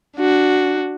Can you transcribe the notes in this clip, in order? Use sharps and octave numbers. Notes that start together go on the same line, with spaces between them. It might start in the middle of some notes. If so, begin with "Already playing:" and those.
D4 F#4